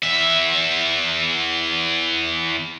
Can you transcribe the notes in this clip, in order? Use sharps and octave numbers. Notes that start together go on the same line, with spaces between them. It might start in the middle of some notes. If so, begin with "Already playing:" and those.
E2 E5